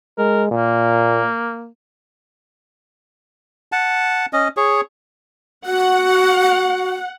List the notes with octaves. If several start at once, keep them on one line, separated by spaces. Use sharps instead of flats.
G#3 A#4
A#2 A#3
F#5 A5
C#4 D#5
G#4 C#5
F#4 F#5